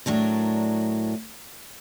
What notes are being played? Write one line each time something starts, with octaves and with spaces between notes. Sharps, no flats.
A2 F#3 D4 A#4